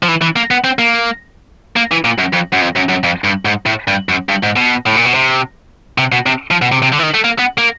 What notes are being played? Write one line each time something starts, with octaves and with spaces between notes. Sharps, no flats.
F3
E3
E3
A#3
B3
C4
A#3
A#3
E3
A#2
F#2
F2
F#2
F2
F#2
F#2
F2
G2
G#2
A2
G2
F#2
G2
G#2
B2
A2
A#2
B2
C3
C3
B2
C3
F3
B2
C3
C3
D3
E3
D#3
A3
A#3
B3
A#3